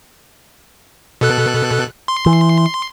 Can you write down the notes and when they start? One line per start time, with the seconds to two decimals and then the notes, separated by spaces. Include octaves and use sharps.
1.21 B2 A4 F#6
2.08 C6
2.26 E3